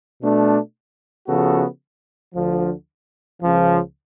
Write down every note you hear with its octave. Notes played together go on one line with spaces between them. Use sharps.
B2 A3 D4
C#3 F3 B3 F#4 A4
D2 D3 F3
C#2 C#3 F3